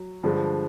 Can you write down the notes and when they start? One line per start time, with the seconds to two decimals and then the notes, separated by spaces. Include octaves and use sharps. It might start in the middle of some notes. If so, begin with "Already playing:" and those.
Already playing: F#3
0.23 G2 D3 F3 G#3